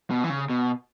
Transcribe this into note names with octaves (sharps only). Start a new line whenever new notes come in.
B2
E3
C#3
B2